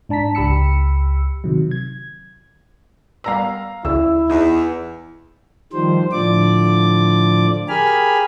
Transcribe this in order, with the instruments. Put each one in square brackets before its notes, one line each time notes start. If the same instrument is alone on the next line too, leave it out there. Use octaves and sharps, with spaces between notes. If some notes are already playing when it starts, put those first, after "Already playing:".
[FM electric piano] G#2 D4 A5 A#5 B6
C#2 G4 B5 E6 C#7
C3 D#3 F#3
G#6
[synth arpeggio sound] G3 B3 A#4 [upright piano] F5 A#5 E6
[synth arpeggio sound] D2 C#3 [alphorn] E4 [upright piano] E6
[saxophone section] E2 [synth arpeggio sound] D#4
[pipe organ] D#3 F3 G3 C5
A2 D3 F3 D5 D6
G4 G#4 A#4 G#5 B5 F6